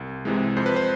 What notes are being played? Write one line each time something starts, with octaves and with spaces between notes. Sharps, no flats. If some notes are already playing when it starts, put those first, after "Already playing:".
Already playing: C2
C3 E3 G#3
F2 C5
B4
C5